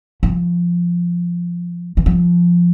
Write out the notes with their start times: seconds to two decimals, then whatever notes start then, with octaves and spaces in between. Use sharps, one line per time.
0.23 F3
1.97 E3
2.06 F3